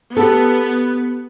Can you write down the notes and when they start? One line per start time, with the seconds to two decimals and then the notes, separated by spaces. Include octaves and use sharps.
0.17 B3 G4 A4